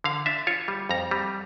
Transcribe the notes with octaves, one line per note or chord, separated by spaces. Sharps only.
D3 F5
D4 E5
F4 C#5
G3
F2 A#5
G3